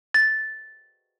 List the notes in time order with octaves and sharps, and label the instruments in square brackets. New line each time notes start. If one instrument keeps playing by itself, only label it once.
[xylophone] A6